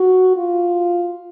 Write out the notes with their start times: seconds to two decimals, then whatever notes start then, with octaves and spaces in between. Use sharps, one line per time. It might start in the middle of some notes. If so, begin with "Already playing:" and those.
Already playing: F#4
0.37 F4